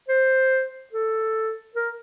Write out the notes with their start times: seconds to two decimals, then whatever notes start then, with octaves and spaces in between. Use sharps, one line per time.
0.08 C5
0.93 A4
1.76 A#4